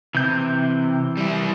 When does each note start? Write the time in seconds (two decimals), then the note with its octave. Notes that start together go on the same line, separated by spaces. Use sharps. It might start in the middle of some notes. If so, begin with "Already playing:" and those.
0.15 C3 E3 G6
1.17 G3 E4